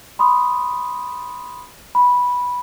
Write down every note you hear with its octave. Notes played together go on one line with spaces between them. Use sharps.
B5 C6 D#6
B5